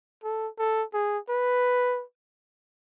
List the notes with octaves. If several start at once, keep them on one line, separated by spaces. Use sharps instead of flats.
A4
A4
G#4
B4